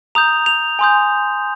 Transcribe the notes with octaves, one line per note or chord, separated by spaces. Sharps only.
A#5 D#6 G6 F7
F7
G#5 C6 D#6 G6